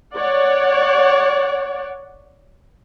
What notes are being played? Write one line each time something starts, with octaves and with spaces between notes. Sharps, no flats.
C#5 D5 F#5